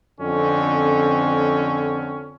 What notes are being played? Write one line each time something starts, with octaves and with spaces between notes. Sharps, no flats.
F2 D3 C4 C#4